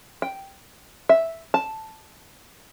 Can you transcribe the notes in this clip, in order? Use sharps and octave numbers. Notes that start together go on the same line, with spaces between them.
G5
E5
A5